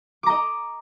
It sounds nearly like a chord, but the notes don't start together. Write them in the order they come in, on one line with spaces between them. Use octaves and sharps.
D6 A#5 D#5